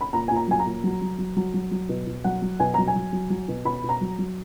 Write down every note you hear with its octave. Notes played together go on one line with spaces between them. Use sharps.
B5
A#2 A#5
A#2 G#5
A#5
F#3 G#5
A#5
A#2
F#3
F#3
F#3
F#3
F#3
F#3
B2
B2
F#3 F#5
F#3
B2 G#5
F#3 A#5
G#5
F#3
F#3
F#3
B2
B2 B5
B2
A#5
F#3
F#3